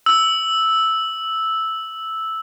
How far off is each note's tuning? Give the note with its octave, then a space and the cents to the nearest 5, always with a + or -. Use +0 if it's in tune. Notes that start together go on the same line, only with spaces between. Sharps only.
E6 -5